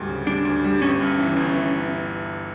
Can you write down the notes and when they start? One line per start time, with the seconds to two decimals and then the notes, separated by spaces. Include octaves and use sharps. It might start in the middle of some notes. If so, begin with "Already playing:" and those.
Already playing: D2 G#2 G3
0.09 C#3
0.27 G3 D4
0.45 D2
0.64 G3
0.82 G1 C#4
1.01 G2
1.18 E3
1.37 G1
1.55 E3